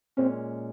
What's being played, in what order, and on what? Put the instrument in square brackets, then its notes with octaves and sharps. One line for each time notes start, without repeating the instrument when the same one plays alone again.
[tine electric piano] A#2 G#3 C#4 [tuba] C4